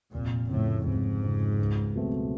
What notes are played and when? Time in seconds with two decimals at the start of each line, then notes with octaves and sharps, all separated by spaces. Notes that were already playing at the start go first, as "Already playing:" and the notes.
0.13 F1 A#2
0.50 F2 A2 C#3
0.86 F1 G#2
1.23 F2 C#3
1.59 C#2
1.95 B2 F#3 A3 C4